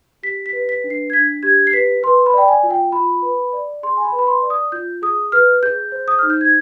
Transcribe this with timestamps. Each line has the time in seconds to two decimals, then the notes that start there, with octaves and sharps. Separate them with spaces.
0.23 G4 B6
0.46 B6
0.53 B4
0.69 B6
0.84 D4
0.90 C7
1.10 G#6
1.13 D4 B6
1.43 G4 G#6
1.67 C7
1.73 B4 B6
2.03 B4 C6
2.26 B5
2.33 D5 G5
2.48 G#5
2.63 F4
2.71 G5
2.92 F4 B5
3.22 B4
3.53 D5
3.83 G#4 C6
3.97 G#5
4.05 B5
4.12 B4
4.19 B5
4.27 C6
4.42 D5
4.50 D#6
4.72 F4 G6
5.02 G#4 D#6
5.32 B4 F6
5.63 G#4 G6
5.92 C5
6.08 D#6
6.19 D#4 F6
6.30 G6
6.41 G#6